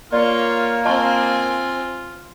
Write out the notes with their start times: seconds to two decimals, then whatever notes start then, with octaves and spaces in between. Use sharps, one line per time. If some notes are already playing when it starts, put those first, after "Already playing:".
0.13 A#3 F4 C#5 D5
0.85 C4 F4 D#5 G#5 A5 C#6